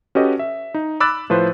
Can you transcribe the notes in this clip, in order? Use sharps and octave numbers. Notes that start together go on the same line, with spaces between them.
C#4 F#4 G4 A4 B4 D#5
E5
D#4
B5 D6 E6 F#6 A6
A2 F3 B4 C5